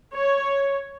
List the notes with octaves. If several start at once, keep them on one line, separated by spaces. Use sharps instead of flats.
C#5